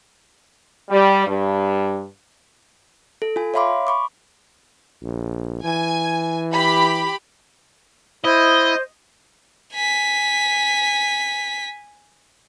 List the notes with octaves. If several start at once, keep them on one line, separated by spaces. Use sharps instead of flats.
G3
G2
A4
F4 G#5
C#5 E5 F5 B5 C6 D6
B5 C#6 D6
A#1
E3 G#5
G4 B5
E4 C5 D#5
G#5 B6